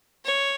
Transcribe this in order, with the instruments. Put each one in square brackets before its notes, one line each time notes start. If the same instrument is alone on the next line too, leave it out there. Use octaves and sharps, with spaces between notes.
[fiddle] C#5